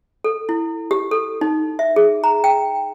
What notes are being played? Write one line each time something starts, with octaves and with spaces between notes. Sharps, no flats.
A4
E4
G4
A4
D#4
E5
G#4
A#5
G5